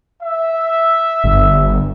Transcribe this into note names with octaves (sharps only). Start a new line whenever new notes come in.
E5
G1